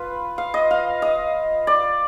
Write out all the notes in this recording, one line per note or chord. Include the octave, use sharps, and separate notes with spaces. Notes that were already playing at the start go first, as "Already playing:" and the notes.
Already playing: F4 B4
F5
D#5
F5
D#5
D5